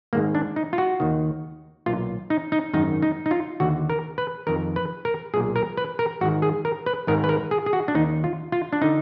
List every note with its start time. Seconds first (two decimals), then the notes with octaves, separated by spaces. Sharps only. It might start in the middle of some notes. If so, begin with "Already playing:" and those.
0.13 G#1 G#2 D#3 A#3
0.35 D4
0.56 D#4
0.73 F4
0.78 F#4
1.00 D#2 D#3
1.86 B1 A#2 F4
2.30 D#4
2.52 D#4
2.73 G#1 F#2 D#3 D#4
3.02 D#4
3.26 D#4
3.31 F4
3.60 D#2 D3 F#4
3.90 A#4
4.18 B4
4.47 F2 D#3 A#4
4.76 B4
5.05 A#4
5.34 B1 A#2 G#4
5.56 A#4
5.77 B4
5.99 A#4
6.21 G#1 G#2 D#3 F#4
6.42 G#4
6.65 A#4
6.86 B4
7.07 G#1 G#2 D#3 A#4
7.24 B4
7.29 A#4
7.51 G#4
7.66 G#4
7.73 F#4
7.88 D4
7.95 D#2 D#3 D#4
8.24 F4
8.52 F4
8.73 D4
8.81 D3 D#4